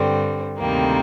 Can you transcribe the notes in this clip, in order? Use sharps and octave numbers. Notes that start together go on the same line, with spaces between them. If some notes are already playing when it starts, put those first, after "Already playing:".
Already playing: G2 D3 G3 C4
D2 C3 D#3 G3 A#3